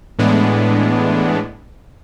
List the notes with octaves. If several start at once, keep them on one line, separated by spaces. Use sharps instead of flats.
A2 E3 G#3 B3 D4